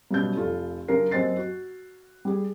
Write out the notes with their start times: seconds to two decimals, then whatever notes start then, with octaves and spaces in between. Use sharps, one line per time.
0.11 G2 B2 F#3 C#4 G6
0.35 F1 F4 A4
0.88 F#2 C#3 D4 A#4 C7
1.11 F#2 A#3 C4 D#5 A6 C7
1.37 F#4
2.25 G3 G#4